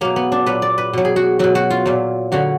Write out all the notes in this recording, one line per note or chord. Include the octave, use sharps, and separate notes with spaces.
B2 F#3 A#3
B3
D4
A#2 F#3 B4
D5
B4
B2 F#3
G#4
F#4
B2 F#3 F#4
F#4
F4
A#2 F#3
D3 F#3 F#4